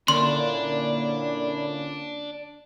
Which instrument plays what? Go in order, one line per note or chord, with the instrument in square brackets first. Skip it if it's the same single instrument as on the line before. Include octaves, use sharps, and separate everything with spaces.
[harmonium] A#2 E4 [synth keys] D3 A#3 C#4 [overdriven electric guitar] D4 [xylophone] C6